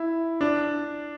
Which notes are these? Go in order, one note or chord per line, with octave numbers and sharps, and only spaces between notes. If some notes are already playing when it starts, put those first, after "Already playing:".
Already playing: E4
D4